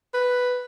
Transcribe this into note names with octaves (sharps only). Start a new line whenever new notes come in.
B4